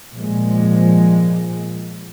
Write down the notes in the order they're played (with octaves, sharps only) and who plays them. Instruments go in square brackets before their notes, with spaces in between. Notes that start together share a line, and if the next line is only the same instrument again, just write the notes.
[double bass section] A#2 F3 G#3